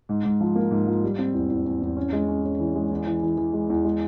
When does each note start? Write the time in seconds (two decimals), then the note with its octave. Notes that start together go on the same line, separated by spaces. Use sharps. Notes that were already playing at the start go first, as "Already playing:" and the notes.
0.09 G#2
0.25 G#2
0.41 F3
0.56 A#3
0.71 G#2
0.87 F3
1.03 G3
1.19 C4
1.34 E2
1.50 E2
1.66 E2
1.82 E2
1.97 C#4
2.13 G#3
2.28 C#4
2.44 C#4
2.60 E3
2.75 G#3
2.91 E2
3.07 E3
3.23 E3
3.38 E3
3.53 G#3
3.70 E2
3.85 G#3